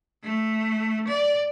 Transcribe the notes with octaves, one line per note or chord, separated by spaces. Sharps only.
A3
D5